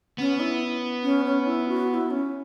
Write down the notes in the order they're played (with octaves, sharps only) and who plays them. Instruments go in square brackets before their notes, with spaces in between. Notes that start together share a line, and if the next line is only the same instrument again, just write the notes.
[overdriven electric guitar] B3 [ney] C#4
[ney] E4
C#4
C#4
E4
F#4
F#4
E4
C#4